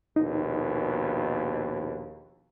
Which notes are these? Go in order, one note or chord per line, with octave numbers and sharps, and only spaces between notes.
A#1 D#2 B2 D#4